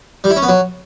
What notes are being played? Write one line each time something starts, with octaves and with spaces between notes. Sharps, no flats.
G3
E4
C#4
B3
F#3